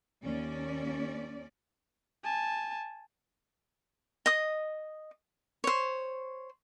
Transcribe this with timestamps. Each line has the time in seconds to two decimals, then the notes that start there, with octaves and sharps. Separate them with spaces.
0.23 D#2 C#4 D5
2.24 G#5 A5
4.26 D#5 D#6
5.64 C5 C#5